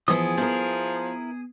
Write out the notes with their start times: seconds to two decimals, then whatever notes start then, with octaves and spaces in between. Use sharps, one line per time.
0.08 E3 F3 B3 E4 G#4 D#6
0.37 F3 B3 E4 A#4